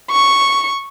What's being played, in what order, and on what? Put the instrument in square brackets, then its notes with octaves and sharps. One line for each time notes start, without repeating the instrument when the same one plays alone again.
[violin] C#6